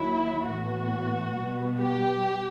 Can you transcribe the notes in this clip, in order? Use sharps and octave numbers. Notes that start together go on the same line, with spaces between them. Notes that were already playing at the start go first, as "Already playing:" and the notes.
Already playing: D#2 D#3 F#3 E4
A2 E3 B3 F#4
B2 G3 B3
G4